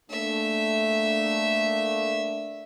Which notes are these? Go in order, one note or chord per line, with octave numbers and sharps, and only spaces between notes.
A3 A#3 D4 E5